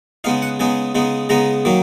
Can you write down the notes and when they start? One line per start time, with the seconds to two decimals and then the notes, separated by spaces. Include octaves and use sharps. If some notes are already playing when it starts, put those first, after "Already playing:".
0.24 C#3 G#3 B3 D#4 F5
0.42 F#5
0.59 C#3 G#3 B3 D#4 G#5
0.95 C#3 G#3 B3 D#4
1.29 C#3 G#3 B3 D#4 A#5
1.65 D#3 F#3 A#3 D#4